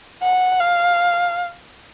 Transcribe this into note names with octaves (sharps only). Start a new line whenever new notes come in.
F#5
F5